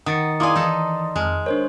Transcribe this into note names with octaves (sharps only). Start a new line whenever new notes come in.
D#3 F#5 D#6 A6 C#7
A#3 E4 G#4 D5 C6 D6 D#6
E3 D#4 A4
F2 G#3 A5 F6
D4 A#4 C5 C#5